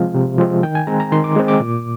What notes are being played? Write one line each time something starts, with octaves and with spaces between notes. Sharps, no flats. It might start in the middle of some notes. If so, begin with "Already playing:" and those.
Already playing: C3 F3 G#3 C4 F5
C3
F3 G#3 C4
D#3 G5
G#5
G#3 C4 A#5
A#5
D#3 C6
D6
G#3 C4
D6
A#2